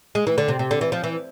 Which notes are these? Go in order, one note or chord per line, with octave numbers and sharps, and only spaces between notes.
G#3
E3
D3
C3
C3
D3
E3
F3
E3